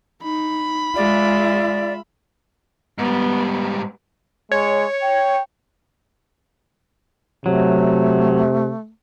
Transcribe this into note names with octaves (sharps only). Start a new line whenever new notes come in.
D#4 B5
G#3 F4 D5 E5
G#2 G3 B3
G#3 C#5
G5
C3 F#3 A3